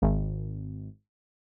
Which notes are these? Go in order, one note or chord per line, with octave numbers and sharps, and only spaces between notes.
G#1